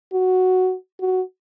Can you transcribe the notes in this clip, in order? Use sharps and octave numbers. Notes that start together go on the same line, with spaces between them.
F#4
F#4